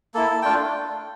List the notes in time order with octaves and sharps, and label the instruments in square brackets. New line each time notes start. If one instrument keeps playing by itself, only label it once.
[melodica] A#3 E4 A4
A3 D4 F4 G5